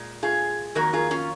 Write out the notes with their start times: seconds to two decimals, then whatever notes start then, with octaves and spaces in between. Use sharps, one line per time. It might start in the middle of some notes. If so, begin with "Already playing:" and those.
Already playing: A#2 G#3
0.23 F4 G#4
0.75 F2 D#3 F#3 A#3 F#4 A#4
0.93 F4 G#4
1.11 C#4 F4